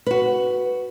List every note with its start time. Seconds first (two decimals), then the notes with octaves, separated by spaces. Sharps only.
0.06 F#4 B4